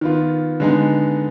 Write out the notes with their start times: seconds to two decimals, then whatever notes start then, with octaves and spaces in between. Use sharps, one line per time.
0.01 D#3 B3 F4
0.60 D3 G#3 B3 D#4